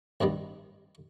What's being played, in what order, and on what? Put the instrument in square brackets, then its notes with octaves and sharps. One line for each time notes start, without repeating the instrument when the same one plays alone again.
[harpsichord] C2 G2 D#3 G3